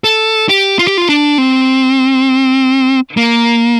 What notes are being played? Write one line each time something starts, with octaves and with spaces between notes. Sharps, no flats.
A4
G4
F4
G4
F4
D4
C4
A#3